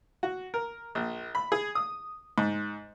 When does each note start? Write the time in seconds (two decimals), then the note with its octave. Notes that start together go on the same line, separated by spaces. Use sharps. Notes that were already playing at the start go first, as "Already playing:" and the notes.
0.23 F#4
0.54 A#4
0.95 A#1
1.35 B5
1.52 G#4
1.75 D#6
2.38 G#2